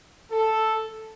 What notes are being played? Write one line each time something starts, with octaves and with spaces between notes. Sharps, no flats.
A4